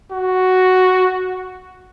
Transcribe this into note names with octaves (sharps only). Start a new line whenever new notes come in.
F#4